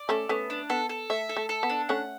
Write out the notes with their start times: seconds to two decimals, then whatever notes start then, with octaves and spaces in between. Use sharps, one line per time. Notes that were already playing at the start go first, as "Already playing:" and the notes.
Already playing: D5
0.09 A3 C#4 A4
0.29 A3 B3 C#4
0.50 D4
0.70 B3 A4
0.89 A4
1.10 A3 E5
1.29 A4
1.37 A3
1.49 A4
1.63 B3
1.70 D4
1.89 A3 C#4 F#5